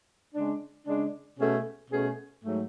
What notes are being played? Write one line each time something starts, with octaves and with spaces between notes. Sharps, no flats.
C#3 G#3 D4
C#3 G#3 D4
B2 A3 C#4 G#4
B2 A3 C#4 G#4
G#2 F#3 A3